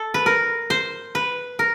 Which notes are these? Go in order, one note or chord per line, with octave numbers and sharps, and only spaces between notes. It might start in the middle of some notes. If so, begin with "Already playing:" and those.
Already playing: A4
B4
A#4
C5
B4
A#4